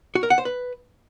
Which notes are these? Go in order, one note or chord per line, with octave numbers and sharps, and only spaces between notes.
F#4
A#4
F#5
C5
B4